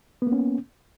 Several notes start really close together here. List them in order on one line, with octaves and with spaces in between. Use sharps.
B3 A#3 C#4